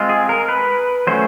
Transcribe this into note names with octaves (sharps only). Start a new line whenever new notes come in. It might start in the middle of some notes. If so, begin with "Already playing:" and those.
Already playing: G#3 C4 F4
G#4
A#4
B4
F#3 A3 C#4 C5